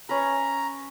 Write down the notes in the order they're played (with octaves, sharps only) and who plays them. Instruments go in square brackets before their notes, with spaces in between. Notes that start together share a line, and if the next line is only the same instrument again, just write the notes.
[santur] C#4 B4 [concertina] A#5